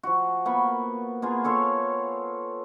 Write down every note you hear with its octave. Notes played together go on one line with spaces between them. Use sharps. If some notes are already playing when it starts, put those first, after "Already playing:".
F3 F#4
A#3 B3 B5 C#6
A#3 B3 F4 G#4
F4 A4 C#5 F5